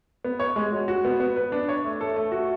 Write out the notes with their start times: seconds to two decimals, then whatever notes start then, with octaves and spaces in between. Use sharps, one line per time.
0.24 B3
0.40 C#5
0.56 G#3
0.72 F#4
0.88 F#4
1.05 B3
1.20 B3
1.36 B4
1.52 D4
1.69 C#5
1.84 A3
2.01 A4
2.16 A3
2.32 F#4